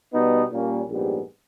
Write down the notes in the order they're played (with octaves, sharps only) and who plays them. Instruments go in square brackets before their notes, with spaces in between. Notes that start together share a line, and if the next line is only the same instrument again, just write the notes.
[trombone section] B2 G3 B3 D#4
A#2 G3 A#3 C#4
A#1 G#2 G3 B3